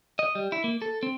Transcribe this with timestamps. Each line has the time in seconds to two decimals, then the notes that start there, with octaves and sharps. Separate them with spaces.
0.19 D#5
0.35 G3
0.52 E4
0.64 A#3
0.82 A4
1.03 C4